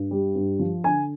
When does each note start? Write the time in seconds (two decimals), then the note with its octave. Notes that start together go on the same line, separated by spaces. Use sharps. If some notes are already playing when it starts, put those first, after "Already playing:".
Already playing: G2
0.11 G3
0.35 G2
0.59 F3
0.84 D3 G#5